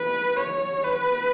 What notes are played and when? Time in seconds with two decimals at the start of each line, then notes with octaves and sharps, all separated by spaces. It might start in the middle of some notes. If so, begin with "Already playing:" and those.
Already playing: B4
0.36 C#5
0.84 B4